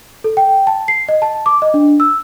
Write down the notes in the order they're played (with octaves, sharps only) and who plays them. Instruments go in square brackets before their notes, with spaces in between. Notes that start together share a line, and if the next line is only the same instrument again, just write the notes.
[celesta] A4
G5
A5
C7
D#5
A5
D6
D#5
D4
E6